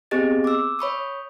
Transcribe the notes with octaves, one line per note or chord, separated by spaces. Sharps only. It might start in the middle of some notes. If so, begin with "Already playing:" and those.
B3 C4 G4 G#4 D#5 A6
D6 E6
C#5 B5 C#6 D#6